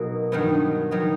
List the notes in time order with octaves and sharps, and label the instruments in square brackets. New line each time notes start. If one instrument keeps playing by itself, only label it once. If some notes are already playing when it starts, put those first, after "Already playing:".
Already playing: [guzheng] B2 F#3 A#3 D#4
G2 D#3 F#3 B3
D#3 F#3 B3